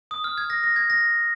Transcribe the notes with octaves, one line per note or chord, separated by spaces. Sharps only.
D#6
F6
G#6
A#6
A#6
G#6
A#6